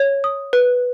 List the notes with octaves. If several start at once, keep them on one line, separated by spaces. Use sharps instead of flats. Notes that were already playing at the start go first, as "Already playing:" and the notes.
Already playing: C#5
D#6
B4